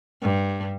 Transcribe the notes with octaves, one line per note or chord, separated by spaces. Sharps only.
G2